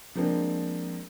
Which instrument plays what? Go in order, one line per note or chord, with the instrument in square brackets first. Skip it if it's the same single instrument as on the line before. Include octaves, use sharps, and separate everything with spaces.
[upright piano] F3 G#3 A#3 C4 D4